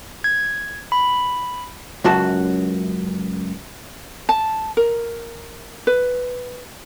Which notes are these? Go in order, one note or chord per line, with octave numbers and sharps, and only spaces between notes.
G#6
B5
C#2 F#2 F#4 A5
A5
A#4
B4